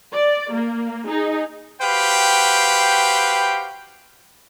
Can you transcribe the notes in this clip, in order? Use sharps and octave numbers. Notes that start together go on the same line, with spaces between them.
D5
A#3
D#4 G#4
F#4 G4 B4 C5 F5 G5